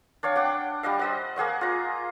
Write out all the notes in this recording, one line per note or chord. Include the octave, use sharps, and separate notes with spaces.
D4 C#5 F5 G5
F#5 G5 D6
G3 D4 D#5 F5
C5 D#5 F#5
A#3 G#4 F#5 C#6
F4 A#5